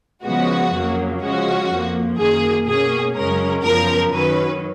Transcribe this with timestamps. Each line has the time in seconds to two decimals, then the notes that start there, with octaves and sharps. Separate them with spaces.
0.25 C#3 F3 G#3 B3 F#4
0.73 F2 C#3 F#3 A#3
1.22 C#3 F3 G#3 C#4 F#4
1.70 F2 F3 A#3
2.19 F#2 D#3 A#3 G#4
2.67 B2 A#3 C#4 G#4
3.16 F#2 C#3 G#3 C#4 A#4
3.64 F#2 C#3 F3 B3 A#4
4.13 F#2 D#3 F#3 C#4 B4